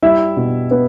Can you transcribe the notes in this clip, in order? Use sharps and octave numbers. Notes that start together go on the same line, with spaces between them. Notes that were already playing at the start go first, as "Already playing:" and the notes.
G3 E4 E5
B2
B3 B4